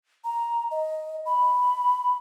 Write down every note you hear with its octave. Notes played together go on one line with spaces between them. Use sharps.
A#5
D#5
B5